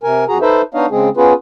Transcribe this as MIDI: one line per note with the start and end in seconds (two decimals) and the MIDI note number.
0.03 0.25 48
0.03 0.25 70
0.03 0.25 80
0.28 0.38 41
0.28 0.38 66
0.28 0.38 68
0.28 0.38 82
0.42 0.62 63
0.42 0.62 69
0.42 0.62 71
0.42 0.62 72
0.42 0.62 76
0.74 0.86 59
0.74 0.86 62
0.74 0.86 63
0.74 0.86 73
0.74 0.86 75
0.74 0.86 77
0.91 1.09 49
0.91 1.09 56
0.91 1.09 60
0.91 1.09 68
1.17 1.33 59
1.17 1.33 61
1.17 1.33 65
1.17 1.33 68
1.17 1.33 71